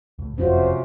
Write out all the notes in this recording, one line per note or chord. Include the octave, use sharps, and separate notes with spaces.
C#2 A2
F#1 F2 C3 C#4 F4 F#4 C5